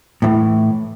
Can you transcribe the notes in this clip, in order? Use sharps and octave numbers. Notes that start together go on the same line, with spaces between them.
A2 E3